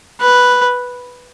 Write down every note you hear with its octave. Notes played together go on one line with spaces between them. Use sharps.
B4